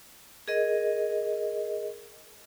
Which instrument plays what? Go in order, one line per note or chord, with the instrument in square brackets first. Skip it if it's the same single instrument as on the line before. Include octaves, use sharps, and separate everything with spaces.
[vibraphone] G#4 A#4 D#5